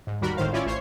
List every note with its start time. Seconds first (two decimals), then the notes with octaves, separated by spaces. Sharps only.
0.07 G#2
0.21 D#2 G3 F#4 A#4 B5
0.37 G#1 A2 D#3 C5 F5
0.53 C#4 E4 F4 C#5 D5
0.66 A1 C5 C#5 C7